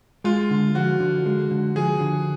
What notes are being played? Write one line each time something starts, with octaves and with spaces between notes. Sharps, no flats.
G#3 F4
D3
F3 F#4
D3
G#3
D3
F3 G#4
D3